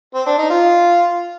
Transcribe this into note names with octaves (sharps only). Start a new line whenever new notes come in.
C4
D4
D#4
F4